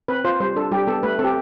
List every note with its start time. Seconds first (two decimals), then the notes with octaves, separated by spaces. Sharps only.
0.08 C4 B4
0.25 F4 C5
0.40 G3 C5
0.56 D4 A4
0.72 G3 G4
0.87 B3 A4
1.03 A3 B4
1.19 C4 A4
1.24 G4